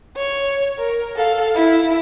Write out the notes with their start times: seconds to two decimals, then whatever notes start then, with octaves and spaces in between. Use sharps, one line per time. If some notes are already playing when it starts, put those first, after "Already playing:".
0.16 C#5
0.78 A#4
1.16 A4 F5
1.55 E4